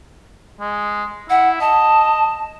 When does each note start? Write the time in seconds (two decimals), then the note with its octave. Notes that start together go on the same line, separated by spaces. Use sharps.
0.60 G#3
1.30 E4 F#5
1.61 D#5 A5